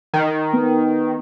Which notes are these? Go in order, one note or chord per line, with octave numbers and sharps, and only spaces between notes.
D#3
B3